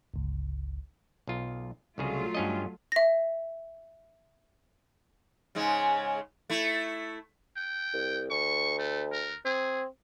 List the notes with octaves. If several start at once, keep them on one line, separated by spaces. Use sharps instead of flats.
G1 C#2
B1 F4
C2 C#3 F#3 A3 F4 G#4
G2 C#4 D#5
E5 A#6
G#2 C#3 G#3
A3 E4
G5
C2
D2 C#6
A3
A#4
C4 G#4